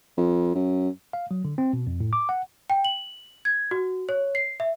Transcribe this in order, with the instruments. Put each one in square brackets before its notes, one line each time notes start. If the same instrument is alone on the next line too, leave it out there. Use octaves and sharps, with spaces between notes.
[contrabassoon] F2
F#2
[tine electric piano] F5
F#3
D3
C4
B2
F2
A2
D6
F#5
[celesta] G5
F#7
G#6
F#4
C#5
C7
E5